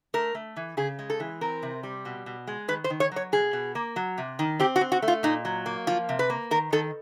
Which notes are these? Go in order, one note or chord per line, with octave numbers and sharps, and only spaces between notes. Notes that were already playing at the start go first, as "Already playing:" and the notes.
A3 A#4
A3
E3
C#3 G#4
G#3
A4
E3
C4 A#4
C3
G3
B2
B2
G#3
D#3 B4
C5
D#3
C#5
F#3 C#5
B2 G#4
B2
A#3
F#3
C3
D#3
C4 G4
F#4
C4
F#4
A3
F4
A#2 D#4
F#3
A#3
F3 F4
C3
B4
A#3
D#3 A#4
D#3 A4